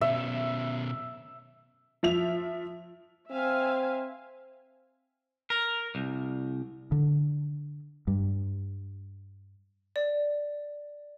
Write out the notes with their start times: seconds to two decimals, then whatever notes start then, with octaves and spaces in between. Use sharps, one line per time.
0.01 B2 C#4 E5
2.03 F3 E5 F7
3.31 C4 E5 F5 G#5
5.50 A#4
5.95 C2
6.92 D3
8.07 G2
9.96 D5